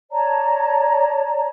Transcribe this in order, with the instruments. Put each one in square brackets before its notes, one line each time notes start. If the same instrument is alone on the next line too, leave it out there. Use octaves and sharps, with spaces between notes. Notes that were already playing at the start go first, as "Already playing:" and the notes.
[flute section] C#5 D5 A5 A#5